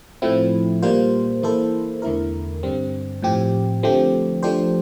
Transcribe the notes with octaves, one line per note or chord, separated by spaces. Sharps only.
A2 F3 A3 C4 E4
A#2 G3 A#3 F4 C5
E3 A#3 E4 A4 C5
E2 D3 A3 E4 A#4
G2 D3 G3 C4
A2 F3 C4 G4
D3 F3 A3 C4 G4
F3 A3 D4 G4 C5